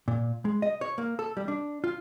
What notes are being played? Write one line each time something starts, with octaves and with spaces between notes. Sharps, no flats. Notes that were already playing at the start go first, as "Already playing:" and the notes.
A#2
G#3
D#5
C#5
A#3
A4
G3
D4
F4